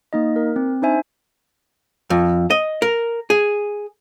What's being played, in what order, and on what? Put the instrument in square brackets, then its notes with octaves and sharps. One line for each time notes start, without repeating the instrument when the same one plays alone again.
[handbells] A#3 D#4 D#5
A#4
C4
D4 D#4 C5 E5 G#5
[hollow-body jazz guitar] F2
D#5
A#4
G#4